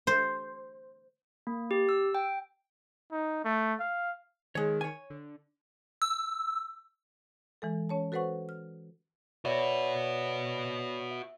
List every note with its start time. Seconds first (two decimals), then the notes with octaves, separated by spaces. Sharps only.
0.07 C5
1.47 A#3
1.71 G4
1.89 E6
2.15 G5
3.12 D#4
3.45 A3
3.80 F5
4.55 D#3 G#3 C#5
4.81 C#5 G#5
5.10 D3
6.02 E6
7.62 E3 G#3 A4
7.89 C#4 C#5 A5
8.12 F#4 A4 B4 C5 F#5 C#6
8.49 F6
9.45 F#4 B4 C#5 D5 E5
11.11 E5